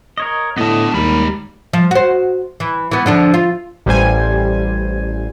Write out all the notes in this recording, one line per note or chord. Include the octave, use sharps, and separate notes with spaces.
A#4 C#5 D#5
A2 D3 B3 D#5 A5
D#2 G3 G#3 A#4 B5
F3
F#4 C5
E3
E3 B3
D3 F3 D4
F4
A1 G3 C5 G#5